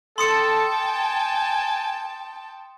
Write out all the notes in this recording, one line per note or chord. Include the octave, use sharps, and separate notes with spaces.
A4 G5 A5 C6 D#6 C#7
G#5